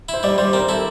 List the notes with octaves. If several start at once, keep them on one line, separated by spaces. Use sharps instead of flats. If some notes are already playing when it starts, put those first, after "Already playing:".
E4 C5
G3 D5
G3 C5
C4 A#4
E4 A4